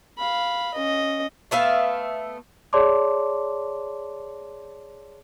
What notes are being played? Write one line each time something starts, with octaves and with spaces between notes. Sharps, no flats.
F5 B5
C#4 D#5
A3 B3 E5 F5
G#4 C#5 D5 A5 C6 D6